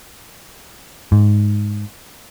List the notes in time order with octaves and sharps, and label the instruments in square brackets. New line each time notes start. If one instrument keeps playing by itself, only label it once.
[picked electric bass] G#2